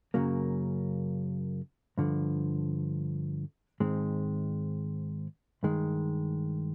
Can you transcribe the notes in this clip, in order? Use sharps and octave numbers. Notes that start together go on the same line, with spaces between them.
F#2 C#3 F#3 A#3
G2 D3 F3
G#2 D#3 G#3 C4
G2 D#3 G#3